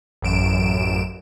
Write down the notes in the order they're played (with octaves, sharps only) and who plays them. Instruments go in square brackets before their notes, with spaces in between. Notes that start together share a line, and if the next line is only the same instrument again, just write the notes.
[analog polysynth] A1 F#2 D7 E7